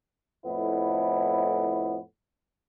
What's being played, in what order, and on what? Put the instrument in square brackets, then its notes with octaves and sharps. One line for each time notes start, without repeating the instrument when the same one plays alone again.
[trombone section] F2 A2 B3 E4